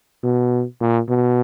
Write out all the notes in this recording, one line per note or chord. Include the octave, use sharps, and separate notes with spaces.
B2
A#2
B2